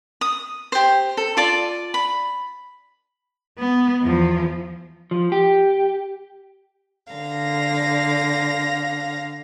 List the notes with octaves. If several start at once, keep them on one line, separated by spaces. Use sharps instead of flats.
D#6
G4 C5
A4
F4 D5 A5
B5
B3
E2 F3
F3
G4
D3 F5 A#6